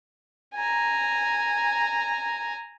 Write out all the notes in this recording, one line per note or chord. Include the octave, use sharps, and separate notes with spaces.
G#5 A#5